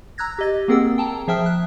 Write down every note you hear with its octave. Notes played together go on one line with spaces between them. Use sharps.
A#5 E6 F#6 G#6 A#6
G4 D#5 A6
A#3 C4 G#4 A#4 F#5 E6
G5 A5 A#5
F3 G#4 E5 G5 D#6 F6
F#6